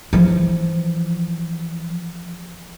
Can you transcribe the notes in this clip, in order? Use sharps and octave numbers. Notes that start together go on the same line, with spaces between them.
E3 F3